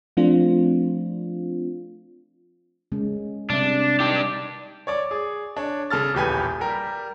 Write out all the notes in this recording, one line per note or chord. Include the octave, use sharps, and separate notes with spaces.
F3 A3 C4 D4 F4
C#3 G#3 C#4
C3 G3 D4 E5
D4 D#4 G4
C#5 D5 D6
G#4
D4 C#5
C#3 A4 F6 A6
D#1 A1 G4 B4 G#5
G3 G4 A#4